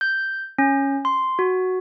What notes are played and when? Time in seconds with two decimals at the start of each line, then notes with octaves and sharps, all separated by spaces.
0.01 G6
0.58 C#4
1.05 C6
1.39 F#4